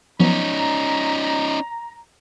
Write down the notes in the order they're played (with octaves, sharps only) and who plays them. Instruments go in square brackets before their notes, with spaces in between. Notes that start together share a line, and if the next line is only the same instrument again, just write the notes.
[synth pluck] F3 F#3 B3 [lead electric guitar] C#4 D#4 [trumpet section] A#5